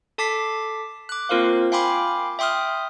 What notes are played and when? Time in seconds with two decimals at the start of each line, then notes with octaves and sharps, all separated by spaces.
0.18 A4 A5 D6 B6 C7
1.09 D6 F#6
1.29 A#3 C4 F4 A#4 C5 F5
1.72 F5 G5 G#5 B5 C6 D6
2.39 E5 G5 C6 D#6 F6